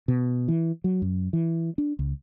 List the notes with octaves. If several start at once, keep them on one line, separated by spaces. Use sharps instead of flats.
B2
E3
F#3
F#2
E3
D4
C#2